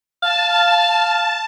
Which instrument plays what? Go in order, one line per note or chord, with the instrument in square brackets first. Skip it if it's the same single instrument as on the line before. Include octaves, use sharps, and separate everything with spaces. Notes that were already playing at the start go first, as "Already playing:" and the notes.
[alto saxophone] F5 [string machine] A5